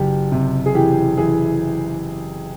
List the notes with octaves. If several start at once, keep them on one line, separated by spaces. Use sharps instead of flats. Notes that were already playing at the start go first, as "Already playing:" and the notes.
Already playing: F#1 G4
C3
G#4
E3 G4
E3 G#4